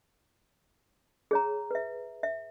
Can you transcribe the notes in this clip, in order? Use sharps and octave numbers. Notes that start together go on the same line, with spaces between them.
G#4 C#5 A#5
B4 E5
E5